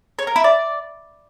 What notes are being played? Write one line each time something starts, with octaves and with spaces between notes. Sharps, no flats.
C#5
A#4
E4
D5